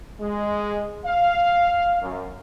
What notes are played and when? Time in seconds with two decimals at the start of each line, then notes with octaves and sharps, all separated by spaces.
0.20 G#3
1.05 F5
2.01 F#2